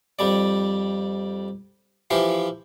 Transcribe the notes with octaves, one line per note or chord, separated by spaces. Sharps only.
F2 G3 D5
E3 F3 G4 F5